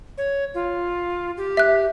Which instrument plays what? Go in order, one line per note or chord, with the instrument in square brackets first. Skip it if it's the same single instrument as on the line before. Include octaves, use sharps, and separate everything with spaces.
[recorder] C#5
F4
G4
[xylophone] E5 F#6